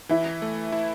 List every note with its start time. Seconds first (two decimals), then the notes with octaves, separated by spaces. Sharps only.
0.09 E3 E4
0.42 A3
0.72 E4